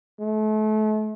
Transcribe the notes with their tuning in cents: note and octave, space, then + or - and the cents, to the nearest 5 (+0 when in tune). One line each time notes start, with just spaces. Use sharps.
A3 -35